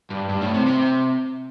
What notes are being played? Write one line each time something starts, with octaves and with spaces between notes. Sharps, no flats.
G2
G2
A2
C3
C3